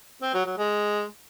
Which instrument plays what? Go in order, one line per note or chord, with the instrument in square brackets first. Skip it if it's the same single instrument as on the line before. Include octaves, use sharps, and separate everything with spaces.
[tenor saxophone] C4
F#3
F#3
G#3